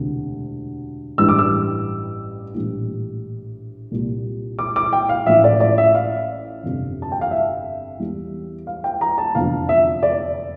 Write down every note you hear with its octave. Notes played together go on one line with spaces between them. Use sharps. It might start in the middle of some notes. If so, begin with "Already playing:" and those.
Already playing: E1 D2 C3
A1 G2 E3 G3 E6
D6
E6
A#1 A2 E3 G3
C2 A#2 G3
D6
D6
G5
F5
A1 A2 F3 E5
D5
D5
E5
F5
G1 F2 C3
A5
G5
F5
E5
E2 E3 G3
F5
G5
A#5
A5
F1 E2 D3 F3 F5
E5
D5